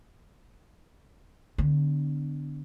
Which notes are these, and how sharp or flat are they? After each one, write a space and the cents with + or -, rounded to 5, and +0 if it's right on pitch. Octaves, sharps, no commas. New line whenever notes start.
D3 +0 B3 +35